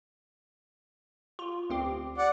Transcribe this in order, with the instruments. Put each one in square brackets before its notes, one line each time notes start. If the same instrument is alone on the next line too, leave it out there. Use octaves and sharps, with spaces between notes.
[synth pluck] F4
D2 C4 G4
[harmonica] D5 F#5